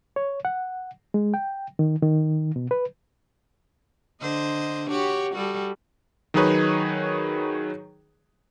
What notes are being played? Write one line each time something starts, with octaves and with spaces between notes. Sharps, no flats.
C#5
F#5
G#3
G5
D#3
D#3
B2
B4
D3 C5 D#5
F#4 G4 C#5
G3 F#4 A4
D#3 F#3 D#4 G#4 B4 C#5